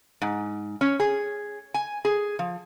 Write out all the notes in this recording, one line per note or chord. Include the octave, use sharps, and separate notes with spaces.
G#2
C#4
G#4
G#5
G#4
F3